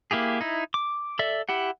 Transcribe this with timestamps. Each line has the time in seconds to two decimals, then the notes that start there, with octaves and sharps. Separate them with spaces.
0.11 A#3 E4 G4 G#4
0.41 D#4 E4
0.74 D6
1.19 A4 D5 E5
1.49 E4 G4 F#5